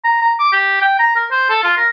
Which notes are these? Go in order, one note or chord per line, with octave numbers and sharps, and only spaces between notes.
A#5
A#5
D6
G4
G5
A#5
A#4
C5
A4
F4
A#4